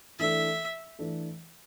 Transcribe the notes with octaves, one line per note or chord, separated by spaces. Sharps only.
E3 A3 D4 A4 E5
E3 A3 D4 A4